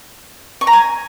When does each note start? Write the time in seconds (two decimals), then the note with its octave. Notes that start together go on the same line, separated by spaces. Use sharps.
0.61 C#6
0.67 A#5
0.73 G#5